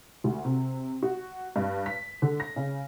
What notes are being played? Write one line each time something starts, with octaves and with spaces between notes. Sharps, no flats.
D2
C3
F#4
G2
B6
D3
A#6
C#3